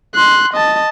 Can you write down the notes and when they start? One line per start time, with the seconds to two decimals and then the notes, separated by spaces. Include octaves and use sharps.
0.15 C6 F#6
0.53 D#5 A5